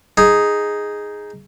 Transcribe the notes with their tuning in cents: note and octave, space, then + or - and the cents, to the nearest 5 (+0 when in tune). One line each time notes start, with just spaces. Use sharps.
D#4 +0 G#4 +0